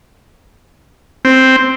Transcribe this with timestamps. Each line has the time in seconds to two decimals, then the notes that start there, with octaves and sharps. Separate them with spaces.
1.25 C4